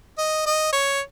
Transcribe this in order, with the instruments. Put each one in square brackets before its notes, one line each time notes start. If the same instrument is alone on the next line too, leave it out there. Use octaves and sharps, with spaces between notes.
[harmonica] D#5
D#5
C#5